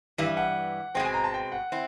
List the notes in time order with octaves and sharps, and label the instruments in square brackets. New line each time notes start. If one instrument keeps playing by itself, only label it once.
[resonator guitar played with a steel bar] G2 E3 G3 [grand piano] E5
[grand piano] F#5
[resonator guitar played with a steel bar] B2 G#3 C4 [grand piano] G5
[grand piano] G#5
A#5
A5
G5
F#5
[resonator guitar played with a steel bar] C4 E4